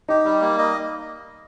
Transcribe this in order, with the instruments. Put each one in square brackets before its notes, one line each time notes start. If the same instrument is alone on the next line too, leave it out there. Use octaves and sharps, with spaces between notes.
[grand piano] D#4 [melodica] G4
[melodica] G3
A#3
D#5